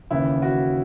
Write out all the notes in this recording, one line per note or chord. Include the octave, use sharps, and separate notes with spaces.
D#2 C#3 E3 E4
F#4